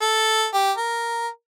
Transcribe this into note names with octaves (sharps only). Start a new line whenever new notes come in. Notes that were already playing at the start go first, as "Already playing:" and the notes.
A4
G4
A#4